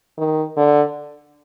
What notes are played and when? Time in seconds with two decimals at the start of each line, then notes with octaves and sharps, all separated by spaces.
0.18 D#3
0.56 D3